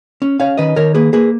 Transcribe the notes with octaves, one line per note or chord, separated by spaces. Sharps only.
C#4
C#4 C#5 F5
D#3 B4 D#5
D#3 A#4 C#5
A#3 G#4 B4
A#3 G#4 B4